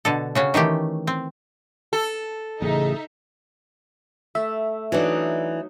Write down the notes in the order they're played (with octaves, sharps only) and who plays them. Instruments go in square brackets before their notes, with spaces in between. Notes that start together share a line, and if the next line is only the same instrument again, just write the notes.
[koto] B2 D3 A4
C#3 C#4 F#4
D#3 E3 A3 G4
C4
[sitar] A4
[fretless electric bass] A1 [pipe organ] C#3 G#4 [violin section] D#4 E5
[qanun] A3 [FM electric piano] E5
[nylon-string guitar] E3 D4 [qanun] F#3 D#4